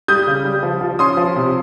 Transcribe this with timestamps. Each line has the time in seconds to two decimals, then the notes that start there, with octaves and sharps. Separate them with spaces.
0.08 G3 D#6 G6
0.27 C#3
0.45 G3
0.63 F3
0.81 F3
0.99 C#4 C6 D#6
1.17 F3
1.36 C3